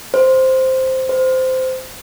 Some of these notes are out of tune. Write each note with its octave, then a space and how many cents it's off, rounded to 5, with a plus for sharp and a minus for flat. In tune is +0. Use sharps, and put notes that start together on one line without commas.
C5 +0
C5 -15